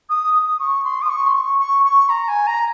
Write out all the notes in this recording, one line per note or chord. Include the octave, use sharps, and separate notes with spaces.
D#6
D#6
C#6
C6
D#6
C#6
C6
C#6
C#6
C#6
A#5
G#5
A#5